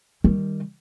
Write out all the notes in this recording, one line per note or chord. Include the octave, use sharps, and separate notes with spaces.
D#3 G3